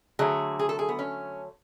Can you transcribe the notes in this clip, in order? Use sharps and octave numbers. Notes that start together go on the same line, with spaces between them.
D3 F#3 A3 G#4
G#4
A4
G#4
B3
C#4